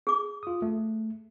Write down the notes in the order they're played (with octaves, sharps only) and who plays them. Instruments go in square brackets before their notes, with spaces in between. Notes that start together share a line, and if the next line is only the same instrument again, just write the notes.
[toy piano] G#4 D6
[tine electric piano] F4 D#6
A3